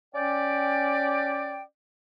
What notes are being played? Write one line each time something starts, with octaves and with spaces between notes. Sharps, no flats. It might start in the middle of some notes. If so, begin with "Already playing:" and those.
C#4 D5 G5